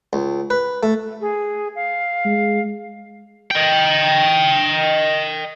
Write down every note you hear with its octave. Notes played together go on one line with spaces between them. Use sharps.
C#2
B4
A3
G#4
F5
G#3
D#5 G5